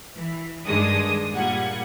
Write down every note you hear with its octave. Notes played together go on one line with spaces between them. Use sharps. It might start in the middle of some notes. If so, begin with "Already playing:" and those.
E3
G2 D#3 G#3 D4 D#5 D#6
A#2 G3 F#5 G#6